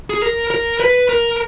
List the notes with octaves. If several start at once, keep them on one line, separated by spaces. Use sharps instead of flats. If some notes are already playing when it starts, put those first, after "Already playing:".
G#4
A#4
A#4
B4
A#4